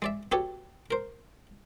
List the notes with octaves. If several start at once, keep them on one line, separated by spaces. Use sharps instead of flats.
G#3 D5 E5
B3 F#4 G4 A4 C#5
A#4 C5